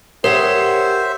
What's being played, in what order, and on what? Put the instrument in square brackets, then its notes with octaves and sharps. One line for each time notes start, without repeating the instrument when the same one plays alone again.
[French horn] G4 [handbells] A#4 [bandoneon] C5 E5 [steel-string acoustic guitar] C#5 F#5